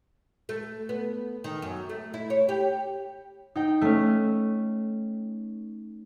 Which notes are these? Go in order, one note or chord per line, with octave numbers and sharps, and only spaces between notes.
A3
B3
D#3
F#2
A3
E4
C#5
G4
D#4 G5
A3 C#4